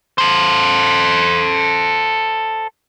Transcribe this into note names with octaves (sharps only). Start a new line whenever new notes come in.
A4 C5